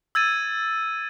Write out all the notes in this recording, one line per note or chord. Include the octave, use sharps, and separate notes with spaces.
E6 G#6 A6 D#7